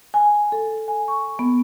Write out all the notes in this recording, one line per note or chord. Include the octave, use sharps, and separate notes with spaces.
G#5
A4
G#5
C#6
B3